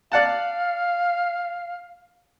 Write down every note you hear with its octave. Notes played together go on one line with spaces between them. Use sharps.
D5 F5 F#5 A5